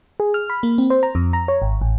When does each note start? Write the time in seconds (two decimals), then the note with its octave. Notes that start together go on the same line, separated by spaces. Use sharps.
0.20 G#4
0.34 F6
0.50 B5
0.63 A#3
0.78 C4
0.90 C5
1.03 A#5
1.15 F2
1.33 A#5
1.48 C#5
1.62 G#1
1.81 A1